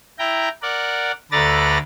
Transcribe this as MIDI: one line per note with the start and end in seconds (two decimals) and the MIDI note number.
0.19 0.48 64
0.19 0.48 79
0.19 0.48 82
0.62 1.12 70
0.62 1.12 74
0.62 1.12 78
1.31 1.78 38
1.31 1.78 69
1.31 1.78 71
1.31 1.78 74
1.31 1.78 82
1.31 1.78 93